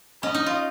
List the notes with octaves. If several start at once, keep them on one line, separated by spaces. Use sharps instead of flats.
C#4 D#5
D#4
F4